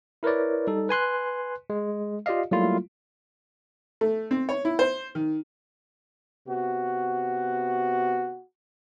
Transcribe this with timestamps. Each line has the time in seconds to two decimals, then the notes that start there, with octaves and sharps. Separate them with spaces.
0.23 E4 A#4 B4 C#5 D5
0.67 G3 D#4 A4
0.89 B4 G#5 C6 F#6
1.70 G#3
2.26 F4 G4 D5 D#5 F5
2.51 F#3 G3 A3 A#3 E4 F4
4.01 A3
4.31 C4
4.49 C#5
4.65 E4
4.79 C5
5.15 D#3
6.48 C3 B3 F#4